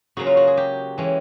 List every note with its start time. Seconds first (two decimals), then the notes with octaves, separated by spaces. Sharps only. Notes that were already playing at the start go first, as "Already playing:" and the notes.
0.17 C#3 F#3 A#3 C#4 F#4
0.27 F4
0.37 F#4
0.47 G#4
0.57 G4
0.98 E3 G#3 C#4